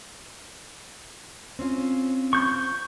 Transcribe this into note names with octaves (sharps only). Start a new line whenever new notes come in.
C4 C#4 F4
C#6 G6